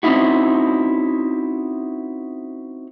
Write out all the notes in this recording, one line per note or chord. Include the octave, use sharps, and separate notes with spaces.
C4 C#4 D#4 E4 F#4